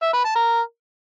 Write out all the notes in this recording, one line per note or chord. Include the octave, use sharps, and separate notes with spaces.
E5
B4
A5
A#4